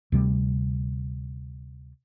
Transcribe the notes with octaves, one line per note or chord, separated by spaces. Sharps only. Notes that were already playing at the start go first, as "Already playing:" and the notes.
D2 C3 G3